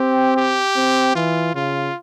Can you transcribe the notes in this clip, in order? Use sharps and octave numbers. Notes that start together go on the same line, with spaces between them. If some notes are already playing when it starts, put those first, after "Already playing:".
Already playing: C4 G4
G4
C4
E3 F4
C#3 F4